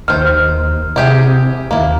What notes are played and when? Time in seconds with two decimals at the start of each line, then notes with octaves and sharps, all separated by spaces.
0.08 D#2 D#3 C5 F6
0.96 C3 E4 G4 G#4
1.71 D#2 A#3 E4